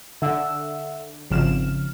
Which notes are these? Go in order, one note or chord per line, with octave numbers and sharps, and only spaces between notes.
D3 E5 F#5 E6
G#1 C#3 F3 F6 E7